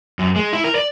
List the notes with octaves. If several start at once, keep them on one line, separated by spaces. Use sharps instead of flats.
F#2
G#3
E4
A#4
D5